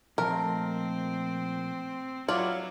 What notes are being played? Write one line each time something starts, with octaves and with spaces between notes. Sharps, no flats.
A#2 F3 A3 C4 A#4 D#5
F#3 E4 F4 D5